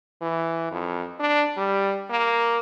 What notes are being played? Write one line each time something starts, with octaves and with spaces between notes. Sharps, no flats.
E3
F2
D4
G3
A#3